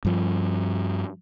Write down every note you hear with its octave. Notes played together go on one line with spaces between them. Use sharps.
G2 F3